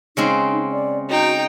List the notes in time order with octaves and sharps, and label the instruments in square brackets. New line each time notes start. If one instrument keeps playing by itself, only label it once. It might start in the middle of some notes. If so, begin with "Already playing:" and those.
[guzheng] C#3 G#3 C4 [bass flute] D#4
[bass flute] D5
[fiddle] D#4 G5 [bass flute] F#4